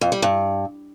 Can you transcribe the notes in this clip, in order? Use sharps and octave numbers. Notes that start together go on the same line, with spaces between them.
F2
G3
G2